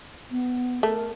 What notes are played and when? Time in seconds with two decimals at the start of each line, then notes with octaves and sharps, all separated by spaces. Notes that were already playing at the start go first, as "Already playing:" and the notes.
0.31 B3
0.83 A3 A#4